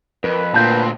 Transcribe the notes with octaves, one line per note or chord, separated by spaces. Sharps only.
F2 A#4 B4
D2 A#2 C4 A5 G6